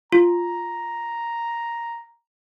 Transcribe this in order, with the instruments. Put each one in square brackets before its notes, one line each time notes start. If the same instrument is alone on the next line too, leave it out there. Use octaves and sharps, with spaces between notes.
[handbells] F4 [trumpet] A#5